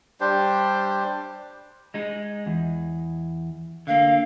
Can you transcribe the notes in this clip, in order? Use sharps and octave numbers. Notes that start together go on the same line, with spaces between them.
G3 D4 G4 C5
G#3 D#4
E2
D3 A#3 F5